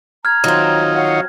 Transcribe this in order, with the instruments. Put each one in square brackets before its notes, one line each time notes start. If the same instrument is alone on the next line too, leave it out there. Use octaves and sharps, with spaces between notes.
[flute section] A#5 [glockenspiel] F6 G#6
[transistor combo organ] D#3 D#4 F4 [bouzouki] F#3 C4
[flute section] C#5 F5 F#5